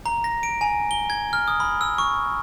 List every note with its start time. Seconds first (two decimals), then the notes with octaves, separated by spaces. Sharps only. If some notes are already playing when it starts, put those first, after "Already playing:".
0.06 A#5
0.24 A#6
0.43 D7
0.61 G#5
0.91 G7
1.10 G#6
1.33 F6
1.48 D#6
1.60 B5
1.81 E6
1.98 C#6